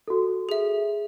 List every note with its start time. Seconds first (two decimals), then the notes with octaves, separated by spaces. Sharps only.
0.08 F#4 A4
0.49 G#4 E5